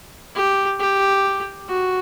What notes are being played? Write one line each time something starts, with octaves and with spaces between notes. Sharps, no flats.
G4
G4
F#4